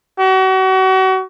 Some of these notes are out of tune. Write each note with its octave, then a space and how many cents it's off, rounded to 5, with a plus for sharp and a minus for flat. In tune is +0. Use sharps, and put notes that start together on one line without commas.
F#4 +35